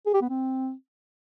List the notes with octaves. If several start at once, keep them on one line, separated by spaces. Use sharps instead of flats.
G#4
G4
B3
C4